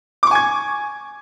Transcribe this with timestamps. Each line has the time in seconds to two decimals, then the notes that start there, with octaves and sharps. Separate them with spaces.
0.23 D6
0.27 C#6
0.31 G#5
0.35 G#6